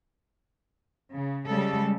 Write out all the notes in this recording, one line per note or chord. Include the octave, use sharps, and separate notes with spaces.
C#3
C#3 G3 G#3 A4